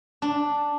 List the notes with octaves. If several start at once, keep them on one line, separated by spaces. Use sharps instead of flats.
D4